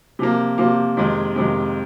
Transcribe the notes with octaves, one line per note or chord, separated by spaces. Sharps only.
C3 F3 A#3
C3 F3 A#3
F2 C3 D#3 G#3
F2 C3 D#3 G#3